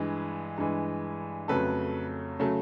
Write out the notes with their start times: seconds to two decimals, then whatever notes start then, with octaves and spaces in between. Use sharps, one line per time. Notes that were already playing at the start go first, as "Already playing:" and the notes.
Already playing: G2 E3 G#3
0.58 G2 E3 G#3
1.48 F2 C#3 F#3 A3 A4 B4
2.39 C#3 F#3 A3